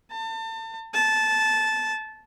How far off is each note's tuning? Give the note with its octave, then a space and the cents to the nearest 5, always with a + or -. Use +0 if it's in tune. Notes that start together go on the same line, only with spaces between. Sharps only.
A5 +35
A5 -15